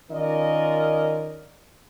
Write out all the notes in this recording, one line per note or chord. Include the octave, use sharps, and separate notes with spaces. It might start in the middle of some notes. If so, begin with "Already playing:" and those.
D#3 C#4 F4 A#4 D5 D#5